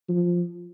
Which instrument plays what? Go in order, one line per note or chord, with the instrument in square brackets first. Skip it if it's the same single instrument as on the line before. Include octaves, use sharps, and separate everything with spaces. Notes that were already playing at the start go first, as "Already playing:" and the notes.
[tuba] F3